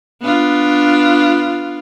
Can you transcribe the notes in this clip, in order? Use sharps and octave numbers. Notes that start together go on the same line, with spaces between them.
B3 D4 F4